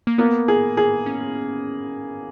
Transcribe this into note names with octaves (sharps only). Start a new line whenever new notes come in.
A#3
A#3 B3
G#4
G#4
C#4